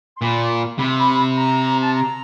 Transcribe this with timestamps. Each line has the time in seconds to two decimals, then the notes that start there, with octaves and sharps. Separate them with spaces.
0.15 C6
0.22 A#2 B5
0.79 C3 B5
0.89 C6
0.98 B5
1.37 A#5
1.84 A5
1.94 A#5